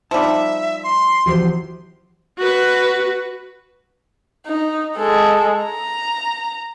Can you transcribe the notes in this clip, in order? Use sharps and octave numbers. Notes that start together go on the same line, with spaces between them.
F3 G3 D#4 E5 A5
C6
C2 E3 F3 F#4 G4 C5
F#4 B4
D#4
G#3 A4
A#5